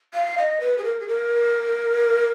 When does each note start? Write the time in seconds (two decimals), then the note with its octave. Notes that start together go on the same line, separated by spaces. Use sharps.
0.14 F5
0.38 D#5
0.60 B4
0.78 G#4
0.84 A#4
1.00 G#4
1.08 A#4